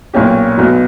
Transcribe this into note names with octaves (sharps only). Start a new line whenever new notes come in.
B1 A#2 A#3 C#4 G4
B1 B2 F#3